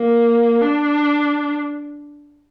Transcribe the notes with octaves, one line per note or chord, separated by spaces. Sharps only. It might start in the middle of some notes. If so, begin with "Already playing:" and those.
Already playing: A#3
D4